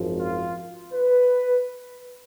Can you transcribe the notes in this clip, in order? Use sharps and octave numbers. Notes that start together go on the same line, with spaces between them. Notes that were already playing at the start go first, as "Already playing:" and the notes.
Already playing: G#1 F#2 F3
F4
B4